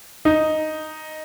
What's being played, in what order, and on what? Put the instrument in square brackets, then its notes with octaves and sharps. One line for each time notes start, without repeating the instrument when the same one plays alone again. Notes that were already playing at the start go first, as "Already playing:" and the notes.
[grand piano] D#4